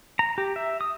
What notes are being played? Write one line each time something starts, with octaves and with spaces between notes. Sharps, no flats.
A#5
G4
E5
D#6